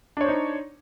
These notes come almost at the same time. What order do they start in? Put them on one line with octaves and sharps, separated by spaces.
D4 C#5 C5 D#4